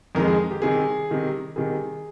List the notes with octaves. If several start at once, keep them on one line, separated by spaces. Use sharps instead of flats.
F2 D#3 G#3 A#4
G#4
G4
C3 D#3 G3 G#4
C3 D#3 G3
C3 D#3 G3 G#4